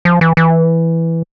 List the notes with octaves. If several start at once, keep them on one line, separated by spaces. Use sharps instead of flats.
F3
E3
E3